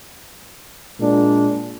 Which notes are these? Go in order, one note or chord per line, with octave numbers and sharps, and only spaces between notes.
A#2 G#3 D4